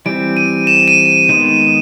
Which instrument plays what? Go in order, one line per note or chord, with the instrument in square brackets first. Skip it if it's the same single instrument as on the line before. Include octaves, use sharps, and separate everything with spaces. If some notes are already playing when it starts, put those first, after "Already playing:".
[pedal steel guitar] E3 G3 C4 [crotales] D7
[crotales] D#7
E7
D#7
[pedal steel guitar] D#3 G#3 B3